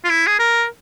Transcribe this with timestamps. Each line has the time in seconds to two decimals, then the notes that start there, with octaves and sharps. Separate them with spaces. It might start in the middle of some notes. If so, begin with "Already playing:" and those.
0.04 F4
0.10 E4
0.27 G#4
0.39 A#4